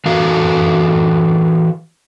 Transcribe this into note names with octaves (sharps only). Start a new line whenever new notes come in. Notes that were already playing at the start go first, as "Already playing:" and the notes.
E3 F#4 A4 D#5 F5 A#5